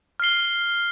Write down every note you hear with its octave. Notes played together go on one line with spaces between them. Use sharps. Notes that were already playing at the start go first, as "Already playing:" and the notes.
F6 C7 G7